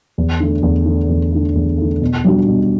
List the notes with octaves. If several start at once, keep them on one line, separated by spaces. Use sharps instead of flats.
E2
D3 A3
E2
D3 A3
E2
D3 A3
E2
D3 A3
B2
G3 D4 F#4
B2